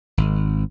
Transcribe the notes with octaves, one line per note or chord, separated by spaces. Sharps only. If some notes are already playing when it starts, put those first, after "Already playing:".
G#1